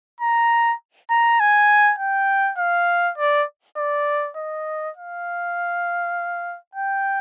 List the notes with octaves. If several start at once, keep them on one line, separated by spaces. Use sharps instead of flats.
A#5
A#5
G#5
G5
F5
D5
D5
D#5
F5
G5